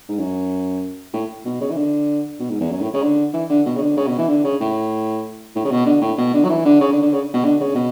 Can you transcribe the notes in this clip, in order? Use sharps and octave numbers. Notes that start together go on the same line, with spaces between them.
G#2
F#2
A2
B2
C#3
E3
D3
B2
G#2
E2
F#2
A2
C#3
D3
E3
D3
B2
C#3
D3
C#3
B2
E3
D3
C#3
A2
A2
C#3
B2
D3
A2
B2
D3
F#3
E3
D3
C#3
D3
D3
C#3
B2
D3
C#3
B2